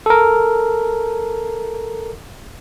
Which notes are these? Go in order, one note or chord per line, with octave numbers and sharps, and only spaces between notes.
A4 A#4